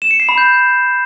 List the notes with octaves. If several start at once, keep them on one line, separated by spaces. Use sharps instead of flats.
E7
C#7
C7
B5
G6